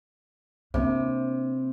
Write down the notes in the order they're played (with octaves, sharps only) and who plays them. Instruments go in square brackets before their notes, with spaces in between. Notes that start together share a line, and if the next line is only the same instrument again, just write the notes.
[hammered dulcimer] C3 [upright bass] A#3 D4